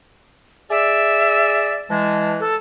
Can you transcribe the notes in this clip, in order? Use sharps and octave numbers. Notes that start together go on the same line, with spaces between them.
G#4 D5 E5
E3 G#3 A5
A4